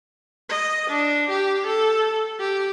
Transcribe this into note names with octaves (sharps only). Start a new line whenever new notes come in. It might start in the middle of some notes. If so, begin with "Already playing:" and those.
D#5
D4
G4
A4
G4